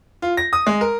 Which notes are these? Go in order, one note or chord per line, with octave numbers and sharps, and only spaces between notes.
F4
A#6
D#6
G#3
A#4